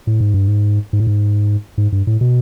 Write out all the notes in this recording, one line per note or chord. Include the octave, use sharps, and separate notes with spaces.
A2
G#2
G2
G#2
G#2
A2
G#2
G#2
G2
A2
B2